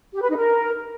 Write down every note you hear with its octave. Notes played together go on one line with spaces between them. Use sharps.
G4
B4
D#4
A#4